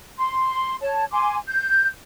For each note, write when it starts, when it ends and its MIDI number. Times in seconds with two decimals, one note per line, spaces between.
0.18 0.77 84
0.81 1.05 73
0.81 1.05 81
1.11 1.36 80
1.11 1.36 84
1.11 1.36 86
1.48 1.88 91